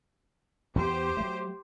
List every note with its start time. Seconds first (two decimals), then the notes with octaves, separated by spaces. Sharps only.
0.76 E2 B3 G4 C5
1.17 F#3 A3